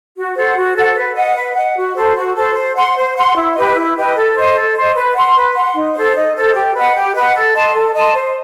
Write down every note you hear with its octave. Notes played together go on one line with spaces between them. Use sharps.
F#4
A4 C5 F#5
F#4
A4 C5 F#5
B4
D#5 F#5
B4
D#5 F#5
F#4
A4 C5
F#4
A4 C5
C5
F#5 C6
C5
F#5 C6
E4
G4 B4 D#5
E4
G4 B4 D#5
A4
C5 D#5
A4
C5
D#5
B4
F#5 C6
B4
F#5 C6
D#4
A4 C5
D#4
A4 C5
G4
B4 D#5 F#5
G4
B4 D#5 F#5
A4
D#5 A5 C6
A4
D#5 A5 C6
C5